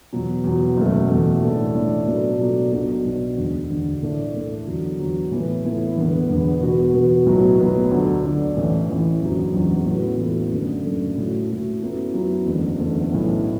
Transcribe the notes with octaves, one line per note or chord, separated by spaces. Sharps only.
E2 B2 F#3
E2 B2 F#3
F#1 E2 B2 A3
F#1 E2 B2 A3
A2 A3 D4 A4
A2 A3 D4 A4
B2 F#3 A3 D4 A4
B2 F#3 A3 D4 A4
B1 B2 F#3 D4 F#4
B1 B2 F#3 D4 F#4
E1 D2 D3
E1 D2 D3
A2 A3 D4
A2 A3 D4
E2 D3 F#3
E2 D3 F#3
A2 E3 B3 E4 A4
A2 E3 B3 E4 A4
E1 E2 D3 B3
E1 E2 D3 B3
E2 B2 B3 F#4
E2 B2 B3 F#4
B1 A2 F#3 B3 F#4
B1 A2 F#3 B3 F#4
D2 D3 F#3 D4 A4
D2 D3 F#3 D4 A4
A1 A2 E3
A1 A2 E3
F#1 E2 D3 F#3
F#1 E2 D3 F#3
A2 E3 B3 F#4 A4
A2 E3 B3 F#4 A4
F#1 F#2 D3 A3
F#1 F#2 D3 A3
A2 A3 F#4
A2 A3 F#4
F#2 F#3 B3 E4
F#2 F#3 B3 E4
F#1 E2 D3 A3
F#1 E2 D3 A3
B1 A2 E3